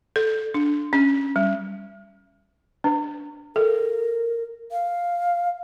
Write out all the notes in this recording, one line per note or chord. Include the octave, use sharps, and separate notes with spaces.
A4
D4
C#4
G3
D4
A4 A#4
F5